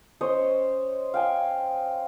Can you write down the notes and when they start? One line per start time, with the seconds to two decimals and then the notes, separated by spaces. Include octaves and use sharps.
0.21 C#4 C5 C#5 D#5
1.14 F5 G5 G#5